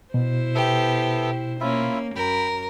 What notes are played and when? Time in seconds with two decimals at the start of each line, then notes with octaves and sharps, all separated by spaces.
0.14 B2 E4 C5
0.55 B3 G4 A4 E5
1.60 A#3 C#4 E4 F4 E5
2.16 F#2 A#4 G5 B5